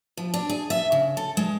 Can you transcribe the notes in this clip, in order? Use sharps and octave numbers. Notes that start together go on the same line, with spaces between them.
F3
D4
G#4
E5
C#3
A4
G#3